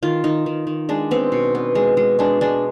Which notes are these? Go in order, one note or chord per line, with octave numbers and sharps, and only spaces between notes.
D#3 F4
D#3 D#4
D#3
D#3
G#3 D4
B3 C4
B2
B3
G#3
G#3
G#3 D4
G#3 D4